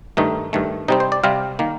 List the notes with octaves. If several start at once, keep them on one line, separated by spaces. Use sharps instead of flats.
G2 D#3 A3 D#4
G2 D#3 A3
C3 G3 C4 D#4
C5
D5
C3 G3 C4 F5
D#3 A#3